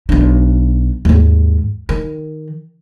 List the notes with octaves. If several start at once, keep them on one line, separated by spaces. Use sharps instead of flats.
B1 D4
D#2 G#2
D#3